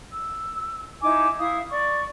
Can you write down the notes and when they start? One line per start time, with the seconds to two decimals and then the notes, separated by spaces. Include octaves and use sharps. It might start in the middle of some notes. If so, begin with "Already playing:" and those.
0.12 E6
1.01 D#4 E4 G#5 D6
1.39 E4 E5 F5 D#6
1.70 D5 C#6